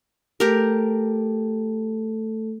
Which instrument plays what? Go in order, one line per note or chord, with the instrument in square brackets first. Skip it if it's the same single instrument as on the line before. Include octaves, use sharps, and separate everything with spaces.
[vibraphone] A3 A4 [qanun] G4 A#4